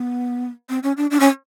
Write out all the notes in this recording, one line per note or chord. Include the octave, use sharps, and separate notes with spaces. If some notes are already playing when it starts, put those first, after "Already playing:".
Already playing: B3
C4
C#4
D4
D4
C#4